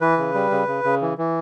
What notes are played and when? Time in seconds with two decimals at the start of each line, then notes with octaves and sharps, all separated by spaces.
0.01 E3 B4
0.18 C#3
0.34 G3
0.51 C#3
0.68 C#3
0.84 C#3
1.02 E3
1.18 E3